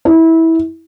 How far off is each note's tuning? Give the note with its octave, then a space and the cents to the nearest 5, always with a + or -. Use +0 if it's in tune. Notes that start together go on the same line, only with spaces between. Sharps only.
E4 -20